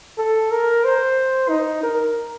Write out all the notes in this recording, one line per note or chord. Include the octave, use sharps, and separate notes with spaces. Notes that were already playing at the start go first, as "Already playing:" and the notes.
A4
A#4
C5
D#4
A#4